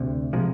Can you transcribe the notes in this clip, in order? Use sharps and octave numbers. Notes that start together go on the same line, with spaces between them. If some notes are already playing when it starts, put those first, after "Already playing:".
Already playing: D2 C3
C3 F3 G#3